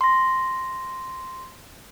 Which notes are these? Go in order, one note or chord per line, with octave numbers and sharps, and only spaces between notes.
C6 A#6